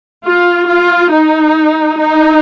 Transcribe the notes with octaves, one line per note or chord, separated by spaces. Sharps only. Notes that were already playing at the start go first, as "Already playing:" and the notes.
F4
F4
D#4
D#4